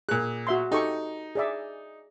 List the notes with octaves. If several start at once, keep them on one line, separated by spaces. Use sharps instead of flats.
A#2 G#4 F#6
F#4 E5 C6
D#4 G4 A4 C#6
G#4 D5 E5